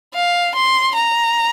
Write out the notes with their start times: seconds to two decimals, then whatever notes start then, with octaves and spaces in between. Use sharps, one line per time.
0.14 F5
0.55 C6
0.95 A#5